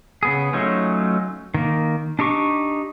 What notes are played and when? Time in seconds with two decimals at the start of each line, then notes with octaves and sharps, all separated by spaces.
0.23 C#3 B3 G#4
0.53 F#3 A3 C#4 D#4 F4
1.54 D#3 A#3
2.19 D4 D#4 G4 C#6 D6